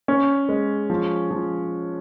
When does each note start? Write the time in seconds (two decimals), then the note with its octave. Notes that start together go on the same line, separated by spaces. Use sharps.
0.08 C#4
0.49 G#3
0.90 F3
1.31 F3